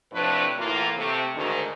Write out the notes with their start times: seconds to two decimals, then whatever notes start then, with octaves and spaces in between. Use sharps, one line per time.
0.13 A2 C3 F3 A3 D4 B4
0.59 A2 E3 A#3 F4
0.98 C3 A3
1.35 D2 G#2 D#3